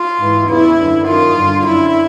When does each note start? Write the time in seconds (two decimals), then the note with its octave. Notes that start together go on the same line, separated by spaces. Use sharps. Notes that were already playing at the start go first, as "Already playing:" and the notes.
Already playing: F4
0.18 G#2 E3
0.48 E2 C#3 E3 E4
0.78 F#2 D3
1.07 F#2 D#3 F4
1.35 G2 D3
1.65 F#2 D3 E4